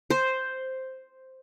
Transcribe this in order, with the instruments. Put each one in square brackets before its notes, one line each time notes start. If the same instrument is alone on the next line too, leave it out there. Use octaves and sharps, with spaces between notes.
[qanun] C5